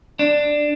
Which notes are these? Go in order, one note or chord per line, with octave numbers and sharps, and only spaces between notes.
D4